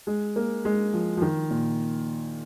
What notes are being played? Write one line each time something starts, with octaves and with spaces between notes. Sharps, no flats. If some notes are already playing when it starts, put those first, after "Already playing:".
G#3
A#3
G#3
F3
F3
D#3
A#2